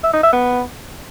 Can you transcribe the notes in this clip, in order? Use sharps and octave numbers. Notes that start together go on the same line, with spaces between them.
E5
D#4
E5
B3